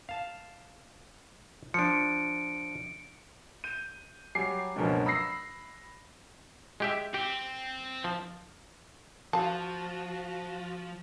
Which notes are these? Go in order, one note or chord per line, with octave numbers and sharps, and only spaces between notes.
F5 A5
F3 D4 C#7 D7
G6 D#7
F#3 G3 G#5 D6 C7
C#2 G2 B2 F3 F#3 A#3
B5 D#6 E6 A#6 C7
G#3 G4 E5
C4 G4
F3
F3 F#4 F5 A5